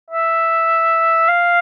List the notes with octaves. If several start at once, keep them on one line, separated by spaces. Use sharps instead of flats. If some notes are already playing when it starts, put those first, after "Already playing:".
E5
F5